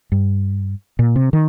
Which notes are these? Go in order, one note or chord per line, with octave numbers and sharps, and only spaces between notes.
G2
A#2
C3
D#3